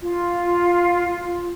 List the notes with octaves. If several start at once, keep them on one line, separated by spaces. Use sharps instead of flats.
F4